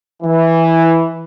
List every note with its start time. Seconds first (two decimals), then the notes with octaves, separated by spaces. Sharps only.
0.23 E3